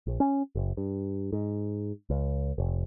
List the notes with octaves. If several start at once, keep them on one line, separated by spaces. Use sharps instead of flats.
A#1
C#4
F#1
G2
G#2
C#2
F1